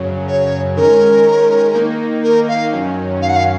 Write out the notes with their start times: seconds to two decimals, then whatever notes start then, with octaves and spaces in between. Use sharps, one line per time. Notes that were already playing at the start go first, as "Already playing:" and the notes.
Already playing: F#2 C#3 F#3
0.28 C#5
0.77 D#3 G#3 C#4 A#4
1.75 D#3 A#3 D#4
2.23 A#4
2.48 F5
2.73 F#2 D#3 F#3 C#4
3.22 F5
3.29 F#5
3.36 F5